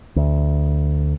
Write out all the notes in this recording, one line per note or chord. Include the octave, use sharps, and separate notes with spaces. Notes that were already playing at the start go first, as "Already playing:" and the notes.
D2